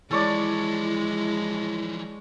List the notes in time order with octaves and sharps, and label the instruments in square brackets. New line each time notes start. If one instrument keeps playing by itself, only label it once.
[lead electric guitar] E3 F3 [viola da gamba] G#3 [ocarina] E4 [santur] A4 C#5 D5